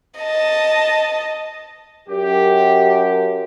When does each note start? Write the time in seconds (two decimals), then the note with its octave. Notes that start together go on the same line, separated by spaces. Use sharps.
0.19 D#5 A5
2.09 F#2 G4